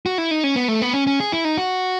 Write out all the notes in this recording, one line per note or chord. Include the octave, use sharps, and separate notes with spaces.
F#4
E4
D#4
C#4
B3
A3
B3
C#4
C#4
G#4
E4
D#4
F#4